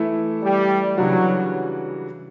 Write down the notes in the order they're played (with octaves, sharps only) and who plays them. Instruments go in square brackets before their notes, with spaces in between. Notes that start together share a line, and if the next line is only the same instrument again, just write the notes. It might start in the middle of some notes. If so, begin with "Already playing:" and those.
Already playing: [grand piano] E3 A3 E4
[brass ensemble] G3
[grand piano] C#3 E3 G3 D4 F#4 [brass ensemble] F#3